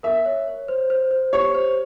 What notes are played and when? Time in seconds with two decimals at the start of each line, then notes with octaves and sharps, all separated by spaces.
0.03 A#4 E5
0.26 C#5
0.47 C#5
0.68 C5
0.90 C5
1.11 C5
1.33 G4 C#5
1.55 C5